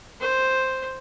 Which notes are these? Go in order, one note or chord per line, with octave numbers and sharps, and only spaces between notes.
C5